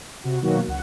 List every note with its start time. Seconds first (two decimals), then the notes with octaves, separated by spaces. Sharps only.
0.24 C3 F#4
0.41 B2 D#3 F#3 A#3 F#4
0.67 C#2 F#5